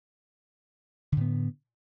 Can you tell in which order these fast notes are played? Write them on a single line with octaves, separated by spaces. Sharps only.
D3 A2 B3